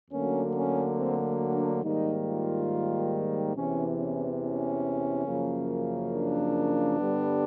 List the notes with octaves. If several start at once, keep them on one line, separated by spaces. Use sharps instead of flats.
D2 D3 F#3 A#3 C#4
C#4
C4
D4
G#2 D#3 G3 A#3 D#4
F4
E2 C3 E3 C#4
C#4
C#4
F#2 C#3 F3 A#3
D4
G2 D3 G3 B3